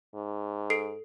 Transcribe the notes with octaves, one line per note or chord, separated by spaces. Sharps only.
G#2
A4 C7 D7